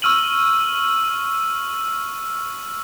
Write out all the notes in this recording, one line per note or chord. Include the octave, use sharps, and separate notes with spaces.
C#6 E6 F6 D#7 F#7